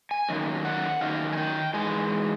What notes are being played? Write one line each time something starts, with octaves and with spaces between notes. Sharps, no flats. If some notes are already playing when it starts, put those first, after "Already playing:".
G#5
F#2 D#3 A#3
F#5
F#2 D#3 F5
G#5
G5
G#2 E3 G#3 G#5